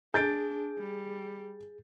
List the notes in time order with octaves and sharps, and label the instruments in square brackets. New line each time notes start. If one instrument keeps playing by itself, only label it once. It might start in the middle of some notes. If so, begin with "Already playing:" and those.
[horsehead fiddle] D4 [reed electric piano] G#4 [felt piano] G6 A6 D7
[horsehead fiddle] G3